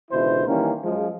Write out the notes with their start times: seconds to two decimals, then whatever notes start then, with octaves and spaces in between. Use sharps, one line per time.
0.11 C#2 B2 D3 E3 E4 C5
0.47 D#3 E3 G3 A#3 C#4
0.84 F#2 F3 G#3